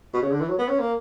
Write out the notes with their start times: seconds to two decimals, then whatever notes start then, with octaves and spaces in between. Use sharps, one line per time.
0.13 B2
0.22 C#3
0.31 D3
0.41 E3
0.48 F#3
0.59 B3
0.68 C#4
0.79 A#3